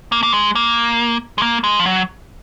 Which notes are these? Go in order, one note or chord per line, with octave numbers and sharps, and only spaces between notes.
A#3
A#3
G#3
A#3
G#3
A#3
G#3
F3
F#3